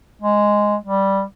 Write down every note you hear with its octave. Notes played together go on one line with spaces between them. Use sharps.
G#3
G3